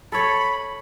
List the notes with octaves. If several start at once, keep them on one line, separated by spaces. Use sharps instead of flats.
A4 C#5 B5